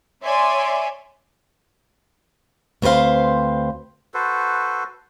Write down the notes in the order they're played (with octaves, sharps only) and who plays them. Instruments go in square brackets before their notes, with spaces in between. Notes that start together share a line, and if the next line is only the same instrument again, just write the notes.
[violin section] C#5 D5 E5 G#5 C6
[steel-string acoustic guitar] D2 C4 B4 C5 F5
[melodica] F#4 A4 B4 C5